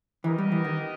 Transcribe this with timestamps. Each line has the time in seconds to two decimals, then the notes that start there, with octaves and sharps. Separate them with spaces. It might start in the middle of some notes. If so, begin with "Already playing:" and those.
0.24 E3 B3 G4 A#4 D#5
0.38 G3
0.52 E3
0.64 D#3